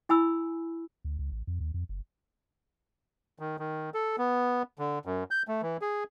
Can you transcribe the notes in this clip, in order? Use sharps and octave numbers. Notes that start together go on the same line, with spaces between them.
E4 G#5 B5 E6
D2
C#2
A1
F2
D#2
F2
F#1
D#3
D#3
A4
B3
D3
F#2
G6
A3
E3
G#4